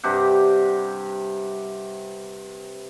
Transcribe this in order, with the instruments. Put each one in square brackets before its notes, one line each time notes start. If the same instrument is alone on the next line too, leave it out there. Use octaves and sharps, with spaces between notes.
[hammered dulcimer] G2 C3 G4 F#5